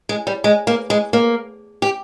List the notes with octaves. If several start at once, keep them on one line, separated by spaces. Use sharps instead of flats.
G#3
G3
G#3
A#3
G#3
A#3
G4